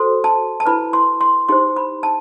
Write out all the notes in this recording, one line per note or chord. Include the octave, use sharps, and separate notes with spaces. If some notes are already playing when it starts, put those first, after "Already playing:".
Already playing: F#4 A4 C5 C6
A5
A5
E4 B4 B5
C6
C6
D#4 G4 C5 C6
B5
A5